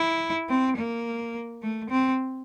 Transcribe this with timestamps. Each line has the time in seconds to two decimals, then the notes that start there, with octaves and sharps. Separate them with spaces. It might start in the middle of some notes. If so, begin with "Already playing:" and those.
Already playing: E4
0.49 C4
0.77 A#3
1.62 A3
1.90 C4